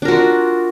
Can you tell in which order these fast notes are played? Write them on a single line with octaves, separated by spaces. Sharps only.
D4 A#4 F#4 F4